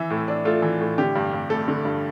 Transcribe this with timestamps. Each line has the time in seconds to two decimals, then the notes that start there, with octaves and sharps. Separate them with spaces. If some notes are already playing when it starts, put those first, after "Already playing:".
Already playing: E3 E5
0.10 A2
0.28 D4
0.45 A3 F4
0.62 E3
0.80 A2
0.98 D3 G4
1.15 G2
1.33 G2
1.50 A3 A4
1.68 D3
1.85 G2